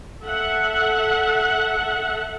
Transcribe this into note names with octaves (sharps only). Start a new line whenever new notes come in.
A4 E5 F#5